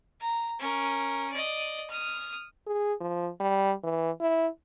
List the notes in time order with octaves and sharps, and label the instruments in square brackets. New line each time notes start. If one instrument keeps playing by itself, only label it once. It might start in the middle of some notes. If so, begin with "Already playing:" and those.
[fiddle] A#5
C#4 A#4
D5 D#5
D#6 F6
[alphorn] G#4
F3
G3
E3
E4